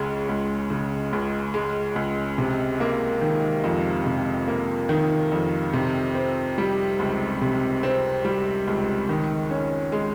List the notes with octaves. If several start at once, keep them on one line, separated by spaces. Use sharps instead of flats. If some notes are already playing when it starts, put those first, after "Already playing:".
Already playing: C#2 C#3 G#3
C#2
C#3
C#2
G#3
C#2
C3
A#3
D#3
F2
C3
A#3
D#3
F2
C3
C4
G3
C#2
C3
C4
G3
C#2
D#3
C#4
G#3